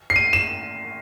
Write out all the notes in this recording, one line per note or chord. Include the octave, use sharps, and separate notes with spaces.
C7
D#7
E7